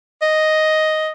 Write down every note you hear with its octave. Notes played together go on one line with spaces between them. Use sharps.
D#5